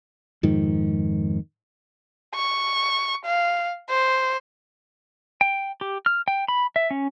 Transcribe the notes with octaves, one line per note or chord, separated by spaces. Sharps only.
F2 G#2 D#3
C#6
F5
C5
G5
G4
F6
G5
B5
E5
C#4